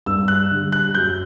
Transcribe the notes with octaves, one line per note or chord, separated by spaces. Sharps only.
G2 E6
F#6
D3 G3
F#6
F#2 G6